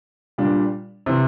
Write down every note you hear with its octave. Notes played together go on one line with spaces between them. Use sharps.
A#2 G3 D4
C3 E3